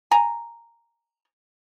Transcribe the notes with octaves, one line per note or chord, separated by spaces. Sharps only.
G#5 A#5